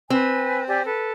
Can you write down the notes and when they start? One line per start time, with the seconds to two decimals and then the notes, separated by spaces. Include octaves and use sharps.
0.10 C4 B4 G#5
0.68 G4 D5 G#5
0.85 A4 B4